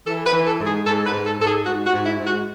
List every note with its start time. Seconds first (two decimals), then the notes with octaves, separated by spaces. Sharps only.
0.07 E3 A4
0.26 B4
0.33 E3
0.46 A4
0.60 G#2
0.66 G#4
0.86 G#2 A4
1.06 B4
1.13 G#2
1.26 A4
1.39 G#2 A4
1.47 G#4
1.66 G#2 F#4
1.86 F#4
1.93 G#2
2.06 E4
2.19 G#2
2.26 F#4